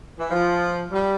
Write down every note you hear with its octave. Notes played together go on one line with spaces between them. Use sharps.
E3
F3
G3